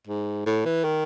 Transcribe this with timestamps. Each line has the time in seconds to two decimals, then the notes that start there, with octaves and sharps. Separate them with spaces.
0.07 G#2
0.46 A2
0.65 E3
0.84 D#3